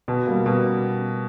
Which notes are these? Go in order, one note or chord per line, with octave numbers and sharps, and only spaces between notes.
B2
G3 A#3
B2